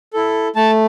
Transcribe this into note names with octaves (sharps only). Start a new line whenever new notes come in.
E4 A4
A3 A5